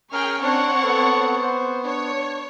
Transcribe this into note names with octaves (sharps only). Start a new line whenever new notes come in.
C#4 G#4 A#4 G5 C#6 F6
C4 D4 C#5 F#5
B3 A4
C5
D4 C#5